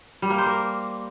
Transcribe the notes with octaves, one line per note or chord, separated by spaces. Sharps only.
G3
A#3
C5
A#4